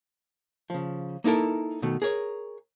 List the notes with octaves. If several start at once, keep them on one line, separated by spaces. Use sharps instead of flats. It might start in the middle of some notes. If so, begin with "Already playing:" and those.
C#3 F3
A#3 D#4 E4 A4 A#4
B2 D#3 A3
G#4 A#4 C#5